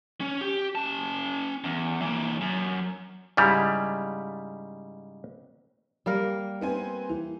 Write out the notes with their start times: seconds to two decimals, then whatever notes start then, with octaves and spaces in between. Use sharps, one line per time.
0.21 C#4
0.41 G4
0.75 C#4 A5
1.64 E2
2.01 E3 A#3
2.41 F#2
3.37 G#2 C#3 G3 E4
6.06 G3 A#3 A#4
6.61 B3 C4 G#5
7.09 E3